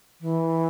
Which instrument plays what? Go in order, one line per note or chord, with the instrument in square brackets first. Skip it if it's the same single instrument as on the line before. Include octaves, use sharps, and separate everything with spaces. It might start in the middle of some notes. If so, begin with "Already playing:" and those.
[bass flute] E3